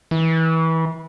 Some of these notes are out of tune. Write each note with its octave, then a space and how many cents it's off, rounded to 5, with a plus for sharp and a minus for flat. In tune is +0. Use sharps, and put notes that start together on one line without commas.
E3 -25